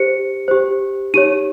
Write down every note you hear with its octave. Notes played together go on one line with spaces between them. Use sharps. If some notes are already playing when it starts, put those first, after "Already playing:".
Already playing: G4 C5 C#7
G4 C5
D#4 G4 C#5 D#7